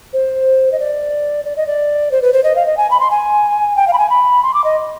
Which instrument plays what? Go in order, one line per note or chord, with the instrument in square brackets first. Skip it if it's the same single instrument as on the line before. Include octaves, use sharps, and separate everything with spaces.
[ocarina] C5
D#5
D5
D5
D#5
D5
C5
B4
C5
D#5
F5
D#5
G#5
B5
C6
G#5
G5
F5
B5
G#5
B5
C6
D6
D#5